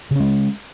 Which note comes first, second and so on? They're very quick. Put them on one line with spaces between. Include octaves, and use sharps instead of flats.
C#3 C#4 G#3